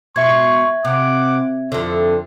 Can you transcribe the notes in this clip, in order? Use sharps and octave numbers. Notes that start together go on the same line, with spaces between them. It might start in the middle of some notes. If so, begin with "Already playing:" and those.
B2 E5 C6 C#6 G#6
C3 F4 F#5 D6
F2 D3 E4 A4 C5